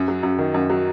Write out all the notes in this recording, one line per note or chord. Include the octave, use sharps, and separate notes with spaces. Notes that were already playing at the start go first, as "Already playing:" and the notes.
Already playing: F#2
F#3
F#2
D#3
F#2
F#3